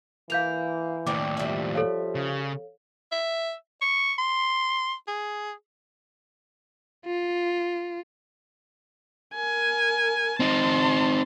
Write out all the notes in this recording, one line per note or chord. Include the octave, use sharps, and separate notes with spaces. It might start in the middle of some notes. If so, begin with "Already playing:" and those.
E3 A#3 F5 G6 F7
D#2 A2 D3 C4 D6
F3 G3 E5
A4 C#5 F5
C#3
E5
C#6
C6
G#4
F4
A#4 G#5
C4 D#4 A5 C6